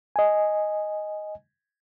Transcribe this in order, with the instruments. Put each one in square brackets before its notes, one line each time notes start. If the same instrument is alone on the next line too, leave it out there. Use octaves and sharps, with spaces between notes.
[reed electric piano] D#5 G#5